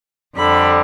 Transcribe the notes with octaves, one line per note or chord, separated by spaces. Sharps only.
F2 D3 G3 B5